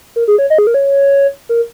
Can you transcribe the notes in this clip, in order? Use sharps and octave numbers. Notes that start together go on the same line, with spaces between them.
A#4
G#4
C#5
D#5
G#4
A#4
C#5
A#4